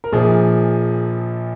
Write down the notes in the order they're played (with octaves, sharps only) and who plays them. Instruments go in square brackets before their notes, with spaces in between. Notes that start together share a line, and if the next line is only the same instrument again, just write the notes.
[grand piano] A#4
A#1 A#2 F3 G#4